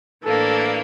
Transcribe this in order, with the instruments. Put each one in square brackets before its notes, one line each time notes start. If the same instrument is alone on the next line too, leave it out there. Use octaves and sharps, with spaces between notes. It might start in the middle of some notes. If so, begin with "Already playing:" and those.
[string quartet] A2 E3 A#3 D4 [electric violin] A4